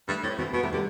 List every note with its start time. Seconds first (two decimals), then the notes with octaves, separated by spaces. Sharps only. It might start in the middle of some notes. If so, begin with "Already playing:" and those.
0.09 G2 A3
0.23 A2 C4
0.38 B2 C4
0.53 B2 B3
0.63 C3 A3
0.73 D3 G3